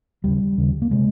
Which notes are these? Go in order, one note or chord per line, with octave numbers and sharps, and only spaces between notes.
D#2 C#3 G3
D#2 C#3
A#3
C3 G#3